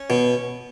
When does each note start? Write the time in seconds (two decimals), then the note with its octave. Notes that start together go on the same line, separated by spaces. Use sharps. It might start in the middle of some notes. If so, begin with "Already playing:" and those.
Already playing: C#4
0.10 B2